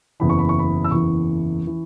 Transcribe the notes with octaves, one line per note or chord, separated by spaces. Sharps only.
F#1 E2 E3 B5
C#6
B5
C#6
B5
E6
F#1 E2 E3 C#6
E3